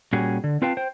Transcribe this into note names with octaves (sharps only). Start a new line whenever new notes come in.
A#2 G3 C#4 F#4 G#4
D3
C4 F4 B4 F5 G5 A5
C5 G5